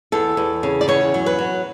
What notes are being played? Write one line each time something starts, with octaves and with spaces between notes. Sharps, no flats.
E2 A4
E2
C#3
D5
E2 C#5
F#3
B4
F#3